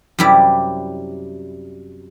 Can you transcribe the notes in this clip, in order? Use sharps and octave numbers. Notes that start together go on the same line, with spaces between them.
F#2 C3 G3 E4 D5